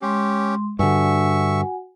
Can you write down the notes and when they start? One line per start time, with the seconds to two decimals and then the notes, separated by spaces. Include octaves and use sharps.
0.02 G#3 C#4 G4 C6
0.79 G2 D3 F#4 E5 F#5 G#5 C#6